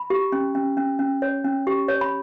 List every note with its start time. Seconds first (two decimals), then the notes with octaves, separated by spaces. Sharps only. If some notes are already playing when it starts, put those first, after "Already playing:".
Already playing: B5
0.10 G4
0.32 C#4
0.55 C#4
0.77 C#4
0.99 C#4
1.22 C#5
1.45 C#4
1.67 G4
1.88 C#5
2.01 B5